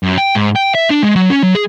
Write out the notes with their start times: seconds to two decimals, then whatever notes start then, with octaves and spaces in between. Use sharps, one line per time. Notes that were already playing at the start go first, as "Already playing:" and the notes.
0.03 F#2
0.18 G5
0.35 G#2
0.56 G5
0.75 E5
0.90 D4
1.02 G#3
1.16 F#3
1.30 C#4
1.43 F#3
1.55 G#4